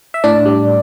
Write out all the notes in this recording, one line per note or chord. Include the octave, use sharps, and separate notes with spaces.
E5
A2 D4 D5
G3